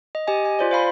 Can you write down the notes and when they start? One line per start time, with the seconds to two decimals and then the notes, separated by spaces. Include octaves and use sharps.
0.15 D#5
0.27 G4 D#5 G#5
0.45 G#5
0.59 F4 C5 D5
0.71 C5 F5 B5 C6